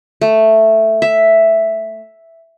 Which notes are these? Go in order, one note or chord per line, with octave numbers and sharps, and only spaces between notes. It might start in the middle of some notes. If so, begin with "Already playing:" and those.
A3
E5